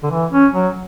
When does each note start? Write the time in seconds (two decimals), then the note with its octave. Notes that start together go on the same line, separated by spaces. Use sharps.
0.03 D3
0.10 E3
0.32 C#4
0.53 F#3